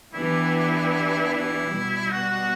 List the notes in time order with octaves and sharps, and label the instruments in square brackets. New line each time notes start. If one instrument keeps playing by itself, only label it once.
[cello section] E3 B3 D4 G4 B4 [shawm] E4
[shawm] E4
[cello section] B2 G3 B3
[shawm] F#4